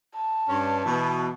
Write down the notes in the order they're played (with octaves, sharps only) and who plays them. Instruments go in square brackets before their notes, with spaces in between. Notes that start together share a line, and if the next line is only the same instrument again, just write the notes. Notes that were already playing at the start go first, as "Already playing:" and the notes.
[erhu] A5
[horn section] G2 C#4
B2 E3